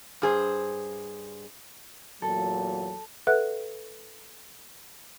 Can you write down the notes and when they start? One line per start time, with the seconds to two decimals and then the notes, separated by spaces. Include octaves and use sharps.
0.22 G2 G#4 C5
2.22 E2 A#2 F#3 A4
3.27 A4 B4 E5 F#5 F#6